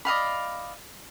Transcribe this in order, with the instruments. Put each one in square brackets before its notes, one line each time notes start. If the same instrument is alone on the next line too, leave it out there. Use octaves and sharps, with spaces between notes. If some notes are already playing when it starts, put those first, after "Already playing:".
[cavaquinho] D5 D#5 F5 B5